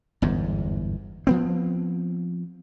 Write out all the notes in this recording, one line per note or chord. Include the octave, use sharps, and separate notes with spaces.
G1 E2 G#2
F3 B3 C4